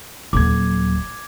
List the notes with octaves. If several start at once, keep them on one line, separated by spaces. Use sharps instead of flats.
D#1 F#3 D6 G#6